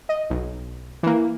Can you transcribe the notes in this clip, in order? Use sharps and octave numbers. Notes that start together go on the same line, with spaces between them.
D#5
B1
E3 A#3